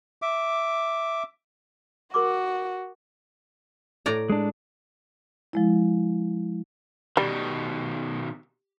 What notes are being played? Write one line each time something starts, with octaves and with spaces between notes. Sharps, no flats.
E5 D6
F#4 A#4 C6 D6
A2 D5 A#5
G#3 D4
F3 G#3 E4
B2 D#3 G3